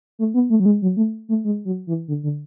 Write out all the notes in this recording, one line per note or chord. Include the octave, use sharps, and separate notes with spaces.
A3
B3
A3
F#3
G#3
F#3
A3
A3
G#3
F#3
E3
D3
D3